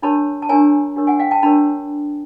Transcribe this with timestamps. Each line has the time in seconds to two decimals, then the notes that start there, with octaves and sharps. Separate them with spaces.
0.02 D4 G4 A#4 C#5 A5 B5
0.42 A5
0.49 D4 G4 A#4 C#5 G#5 A#5
0.96 D4 G4 A#4 C#5
1.07 F#5 G#5
1.19 F5 G5
1.31 G5 A5
1.43 D4 G4 A#4 C#5 A5 B5